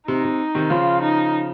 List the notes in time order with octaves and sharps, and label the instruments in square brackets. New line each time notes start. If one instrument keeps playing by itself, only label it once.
[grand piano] C3 [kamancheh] D#4
[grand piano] C3
C3 D#3
[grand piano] C#3 F3 [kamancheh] F4
[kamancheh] D#4